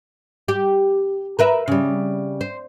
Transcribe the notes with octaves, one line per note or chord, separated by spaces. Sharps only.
G4
A#4 B4 E5
C#3 G3
C5